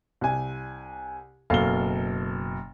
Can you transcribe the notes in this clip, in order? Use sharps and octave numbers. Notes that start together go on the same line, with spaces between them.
C2 G#5
F#1 B2 A4 F5 G7